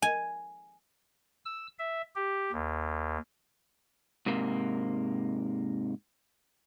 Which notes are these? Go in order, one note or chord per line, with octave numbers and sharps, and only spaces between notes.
G#5
E6
E5
G4
D#2
G#2 C3 A#3